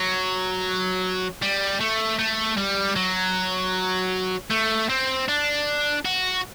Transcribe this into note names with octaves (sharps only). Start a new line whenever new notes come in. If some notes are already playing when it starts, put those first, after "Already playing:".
Already playing: F#3
G3
A3
A3
G3
F#3
A3
C4
D4
F#4